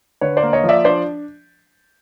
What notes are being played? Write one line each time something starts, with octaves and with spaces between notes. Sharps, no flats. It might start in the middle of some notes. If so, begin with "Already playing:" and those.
D3 B4 C#5
C5 D5
A#3
C#5 D#5
F3
D5 E5
D4 C5 D5